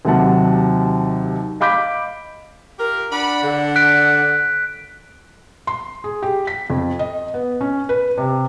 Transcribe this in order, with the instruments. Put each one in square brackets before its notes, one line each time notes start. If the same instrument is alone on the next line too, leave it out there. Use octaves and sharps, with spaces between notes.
[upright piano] D#2 C3 F#3 F#5 A5
D#5 F5 B5 D6 G6 B6
[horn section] F4 G4 A#4
[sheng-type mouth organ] D4 F#5 [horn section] D5 B5
[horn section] D3
[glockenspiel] F#6 B6 D7
[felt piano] C6
G#4
G4
B6
F2
D#5
B3
C#4
B4
C3